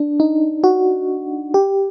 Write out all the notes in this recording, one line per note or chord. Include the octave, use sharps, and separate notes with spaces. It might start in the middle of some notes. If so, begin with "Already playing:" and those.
Already playing: D4
D#4
F#4
G4